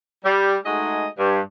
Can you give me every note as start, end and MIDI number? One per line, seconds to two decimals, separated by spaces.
0.24 0.55 55
0.65 1.07 56
0.65 1.07 57
0.65 1.07 63
0.65 1.07 66
0.65 1.07 68
0.65 1.07 75
1.18 1.39 43